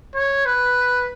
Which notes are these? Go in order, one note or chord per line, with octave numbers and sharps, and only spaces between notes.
C#5
B4